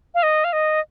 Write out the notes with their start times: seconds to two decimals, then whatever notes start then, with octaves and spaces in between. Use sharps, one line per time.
0.14 F5
0.23 D#5
0.44 F5
0.53 D#5